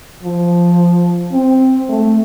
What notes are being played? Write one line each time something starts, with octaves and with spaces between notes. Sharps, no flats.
F3
C4
A3